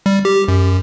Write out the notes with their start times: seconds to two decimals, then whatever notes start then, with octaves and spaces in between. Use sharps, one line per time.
0.06 G3
0.25 G4
0.48 F#2